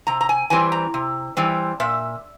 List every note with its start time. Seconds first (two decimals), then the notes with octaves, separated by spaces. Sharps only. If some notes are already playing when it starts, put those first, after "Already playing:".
0.07 C3 A#5
0.21 A#5
0.29 G#5
0.50 E3 G3 C4 G#5
0.72 A#5
0.94 C3
1.37 E3 G3 C4
1.80 A#2 E5